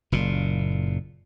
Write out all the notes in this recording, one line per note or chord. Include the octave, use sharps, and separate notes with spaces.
F#1 A#2